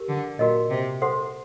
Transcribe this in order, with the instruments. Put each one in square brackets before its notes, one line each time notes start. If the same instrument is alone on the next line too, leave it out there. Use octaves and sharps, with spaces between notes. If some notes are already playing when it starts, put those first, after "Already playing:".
Already playing: [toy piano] G4 A#4
[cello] D3
[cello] A#2 [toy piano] F#4 A#4 D#5
[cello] C3
[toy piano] A4 C5 F#5 C6